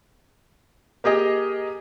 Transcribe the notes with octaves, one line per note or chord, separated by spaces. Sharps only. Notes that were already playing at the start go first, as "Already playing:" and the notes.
A#3 G4 G#4 D#5